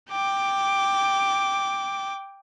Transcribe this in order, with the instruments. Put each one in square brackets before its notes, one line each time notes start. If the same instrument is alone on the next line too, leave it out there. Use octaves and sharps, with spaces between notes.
[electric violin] G5 D6